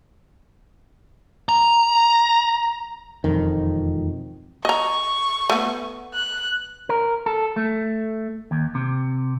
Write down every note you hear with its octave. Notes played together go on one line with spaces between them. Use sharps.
A#5
E1 F2 D#3
D#5 A#5 C#6
A3 B3
F#6
A#4
A4
A3
D#2
C3